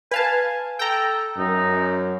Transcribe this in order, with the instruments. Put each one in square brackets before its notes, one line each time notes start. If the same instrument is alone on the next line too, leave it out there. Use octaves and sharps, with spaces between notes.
[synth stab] B4 F5 A5 [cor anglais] G#5
[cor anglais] A4 [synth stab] G5 A#5
[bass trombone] F#2 [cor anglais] D#4